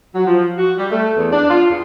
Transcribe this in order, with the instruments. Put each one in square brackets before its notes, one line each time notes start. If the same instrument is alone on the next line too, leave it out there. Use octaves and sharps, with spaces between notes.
[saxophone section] F#3
F3
F#4
G3
A3
E2
D4
F4
E2